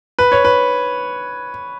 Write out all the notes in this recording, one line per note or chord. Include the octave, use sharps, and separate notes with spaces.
B4
C#5
B4